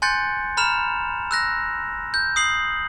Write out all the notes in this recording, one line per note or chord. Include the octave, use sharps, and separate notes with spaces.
G#5 C6 F#6 G6 A6 C#7
A#5 B5 F6 E7 F7
E6 F#6 A#6
G6
D#6 C7 F#7